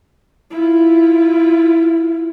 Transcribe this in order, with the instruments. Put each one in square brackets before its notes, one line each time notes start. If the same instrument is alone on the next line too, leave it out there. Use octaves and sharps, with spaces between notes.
[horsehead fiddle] E4 F4